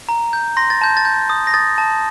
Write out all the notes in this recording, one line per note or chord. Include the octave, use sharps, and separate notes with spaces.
A#5
G6
C6 A#6
A6
A5 G6
A6
G6
D#6
A#6
D#6 A6
A5